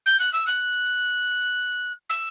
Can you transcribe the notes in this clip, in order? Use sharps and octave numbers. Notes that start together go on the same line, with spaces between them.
G6
F#6
E6
F#6
E6